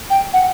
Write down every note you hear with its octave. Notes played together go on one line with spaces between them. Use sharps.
G5
F#5